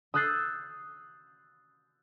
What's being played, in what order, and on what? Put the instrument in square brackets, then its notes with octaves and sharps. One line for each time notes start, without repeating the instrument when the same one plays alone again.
[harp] D#6 E6 F#6 G6 A6 C7